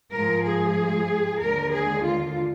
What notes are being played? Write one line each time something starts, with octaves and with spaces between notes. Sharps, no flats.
G#2 F3 G#3 A#4
G#4
D#2 D3 G#3 A#4
G#4
F4